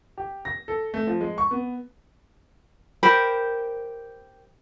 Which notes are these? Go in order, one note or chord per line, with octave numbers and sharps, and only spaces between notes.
G4
A#6
A4
A3
F3
G#3
C#6
B3
G4 A#4 C5 B5